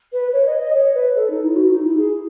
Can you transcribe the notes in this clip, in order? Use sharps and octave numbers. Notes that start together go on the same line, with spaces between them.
B4
C#5
D#5
D#5
C#5
B4
A4
D#4
E4
F#4
D#4
E4
G#4